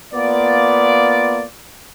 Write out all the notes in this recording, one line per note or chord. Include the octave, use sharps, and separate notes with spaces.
A#3 B3 F4 D5